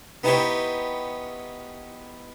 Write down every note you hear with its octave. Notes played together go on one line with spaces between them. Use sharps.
B3 D#4 E4 G4 C5 C#5